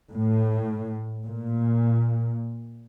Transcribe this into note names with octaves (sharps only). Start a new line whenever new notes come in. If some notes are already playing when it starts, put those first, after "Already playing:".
A2
A#2